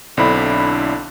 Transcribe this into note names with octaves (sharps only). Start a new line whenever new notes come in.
B1 D3 C4 D4 E4 B5